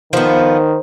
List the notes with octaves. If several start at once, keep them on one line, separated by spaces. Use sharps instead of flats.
D#3 F3 B3 C5